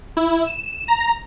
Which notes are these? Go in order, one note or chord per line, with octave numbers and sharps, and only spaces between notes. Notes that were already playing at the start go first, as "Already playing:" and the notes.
E4
E7
A#5